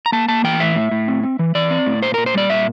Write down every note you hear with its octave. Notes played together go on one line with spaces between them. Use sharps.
A#5
A#3 A5
A#3 A5
E3 G5
A2 E5
A2
A2
C4
C4
E3
E3 D5
C4
A2
A#2 C5
A#2 A#4
C5
G3 D5
A#2 E5